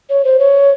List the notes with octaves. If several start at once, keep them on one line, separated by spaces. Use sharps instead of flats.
C#5
C5
C#5